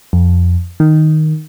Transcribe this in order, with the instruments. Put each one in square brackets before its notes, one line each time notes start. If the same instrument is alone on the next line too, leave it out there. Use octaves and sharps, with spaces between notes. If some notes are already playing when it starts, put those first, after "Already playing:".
[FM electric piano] F2
D#3